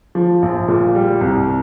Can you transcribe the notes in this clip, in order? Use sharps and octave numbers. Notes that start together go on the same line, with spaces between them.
F3
A#1
A#2
G3
C2